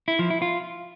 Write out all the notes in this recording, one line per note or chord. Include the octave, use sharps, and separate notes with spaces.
E4
F3
E4
F4